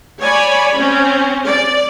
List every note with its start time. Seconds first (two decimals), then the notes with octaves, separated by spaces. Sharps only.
0.19 C#5 D5 G#5 B5
0.75 C4 C#4
1.46 D5